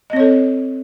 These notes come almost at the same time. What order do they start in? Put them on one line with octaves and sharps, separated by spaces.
D#5 C4 C#5 A4